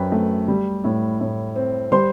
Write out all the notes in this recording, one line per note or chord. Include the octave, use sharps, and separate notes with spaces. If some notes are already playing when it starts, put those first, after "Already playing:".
Already playing: F#2 C4 F#4 B4 G5 B5
A3
G3
A2
A2
C4
G3 C5 C6